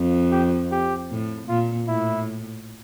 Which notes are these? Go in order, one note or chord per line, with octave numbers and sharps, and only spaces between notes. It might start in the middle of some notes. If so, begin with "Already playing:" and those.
Already playing: F2
G4
G4
A2
A#2 F4
A2 E4